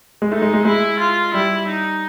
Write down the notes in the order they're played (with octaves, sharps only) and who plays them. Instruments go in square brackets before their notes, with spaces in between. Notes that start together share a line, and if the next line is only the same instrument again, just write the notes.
[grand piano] G#3
[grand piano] A3 [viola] D#4
[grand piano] G#3
G#3
[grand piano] G#3 [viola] E4
[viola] F4
[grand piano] G3 [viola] E4
[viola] D#4